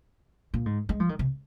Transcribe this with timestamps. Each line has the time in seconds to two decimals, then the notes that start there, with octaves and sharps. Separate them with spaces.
0.54 A#2
0.66 G#2
0.89 G#3
1.00 F3
1.09 D#3
1.19 C3